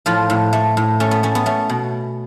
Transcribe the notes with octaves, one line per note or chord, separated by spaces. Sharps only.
A2 F3 F4
A2
A3
A2
A3 C#4
B3
A3 C#4
B3
A3 C#4
B2